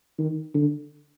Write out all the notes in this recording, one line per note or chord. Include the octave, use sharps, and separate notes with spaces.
D#3
D3